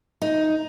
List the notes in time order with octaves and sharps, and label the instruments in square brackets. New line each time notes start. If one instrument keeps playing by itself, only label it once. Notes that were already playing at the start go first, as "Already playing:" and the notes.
[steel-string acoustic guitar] D#4